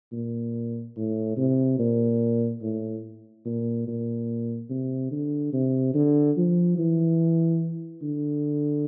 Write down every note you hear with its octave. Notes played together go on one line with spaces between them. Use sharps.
A#2
A2
C3
A#2
A2
A#2
A#2
C3
D3
C3
D3
F3
E3
D3